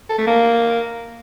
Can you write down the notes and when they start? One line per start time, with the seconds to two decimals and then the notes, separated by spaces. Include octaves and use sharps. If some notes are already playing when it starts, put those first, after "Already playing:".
0.10 A4
0.18 A3
0.27 A#3